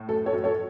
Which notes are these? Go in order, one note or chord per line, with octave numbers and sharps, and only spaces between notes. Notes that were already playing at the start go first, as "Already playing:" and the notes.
Already playing: A2
F#2 A4
A4 C#5
F#2
A4 C#5